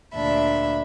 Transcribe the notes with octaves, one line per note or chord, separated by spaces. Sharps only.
D2 A#2 D4 E5 B5